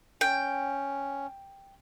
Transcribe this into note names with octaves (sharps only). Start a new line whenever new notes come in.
C#4 G5